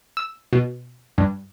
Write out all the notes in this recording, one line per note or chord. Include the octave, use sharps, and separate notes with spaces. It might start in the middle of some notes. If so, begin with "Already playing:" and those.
E6
B2
G2